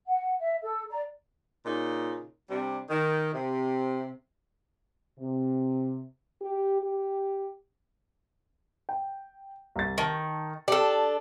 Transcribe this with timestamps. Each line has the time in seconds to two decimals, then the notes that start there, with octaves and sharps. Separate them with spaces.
0.08 F#5
0.39 E5
0.63 A4 E6
0.91 D5 A#5
1.65 A#2 C#3 D#4
2.50 C3 G3 D4
2.89 D#3
3.33 C3
5.19 C3
6.42 G4
6.83 G4
8.89 G5
9.76 C2 A6
9.98 D#3 A5 C#6
10.68 D4 G4 A4